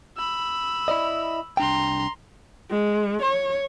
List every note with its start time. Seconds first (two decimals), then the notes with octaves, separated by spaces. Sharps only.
0.17 B5 E6
0.88 E4 D5 D#5
1.57 C2 D4 G5 A#5 C6
2.71 G#3
3.22 C#5